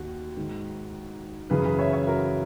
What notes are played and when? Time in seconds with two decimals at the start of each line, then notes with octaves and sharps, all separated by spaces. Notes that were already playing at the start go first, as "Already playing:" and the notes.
Already playing: D#2 D#3 F#4
0.36 G#2 D#3
1.50 F#2 C#3 E3 G#4 B4
1.65 G#4 B4
1.79 C#5 E5
1.93 C#5 E5
2.07 F#4 A#4